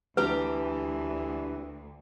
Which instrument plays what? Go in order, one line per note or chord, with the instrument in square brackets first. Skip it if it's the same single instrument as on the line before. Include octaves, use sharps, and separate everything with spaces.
[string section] D2 [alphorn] E3 [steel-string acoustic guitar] D4 G4 A#5 [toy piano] B4